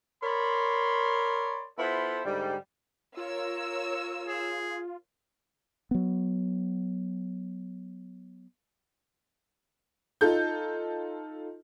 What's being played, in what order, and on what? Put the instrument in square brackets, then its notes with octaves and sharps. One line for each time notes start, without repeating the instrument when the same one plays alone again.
[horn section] A#4 C#5 D5 B5 C6
B3 E4 F4 A4 C5
G#2 D3 G3
[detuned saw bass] F4 [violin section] A#4 C#5 E6
[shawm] G#4
[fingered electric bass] F#3 B3
[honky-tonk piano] D#4 F4 A4 G6